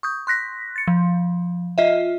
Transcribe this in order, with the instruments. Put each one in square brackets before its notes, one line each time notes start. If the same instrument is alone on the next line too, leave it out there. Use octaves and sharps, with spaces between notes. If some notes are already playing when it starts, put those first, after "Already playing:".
[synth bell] C#6 D#6 G6
C6 F#6 A#6 B6
A6 C#7
F3
F4 D#5 E5